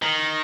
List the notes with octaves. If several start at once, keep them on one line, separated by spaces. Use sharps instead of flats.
D#3